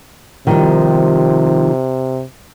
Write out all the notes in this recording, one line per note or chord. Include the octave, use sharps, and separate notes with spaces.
C3 D#3 F3 G3